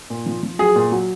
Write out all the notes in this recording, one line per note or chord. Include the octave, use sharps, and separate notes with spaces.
A#2
F3
F3
F#3 G#4
A#2
F#3